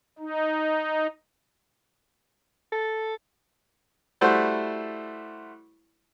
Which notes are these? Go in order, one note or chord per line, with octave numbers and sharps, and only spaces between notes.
D#4
A4
G3 A3 E4 F#4 C5